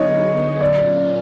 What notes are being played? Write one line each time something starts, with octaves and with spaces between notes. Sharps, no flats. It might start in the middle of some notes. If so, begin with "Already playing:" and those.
Already playing: D3 F#3 B3 D#4 G#4 C#5 D#5
A#2 F#3 A#3 C#4 F4 D5